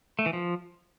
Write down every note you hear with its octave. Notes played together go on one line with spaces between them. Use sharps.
A3
E3
F3